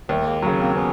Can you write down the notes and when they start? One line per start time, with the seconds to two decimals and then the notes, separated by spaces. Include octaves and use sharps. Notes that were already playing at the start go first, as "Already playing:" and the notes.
0.09 D#2 G3 A3
0.26 G#3 A#3
0.43 C#3 F#3
0.59 A#3 C4
0.76 B3 C#4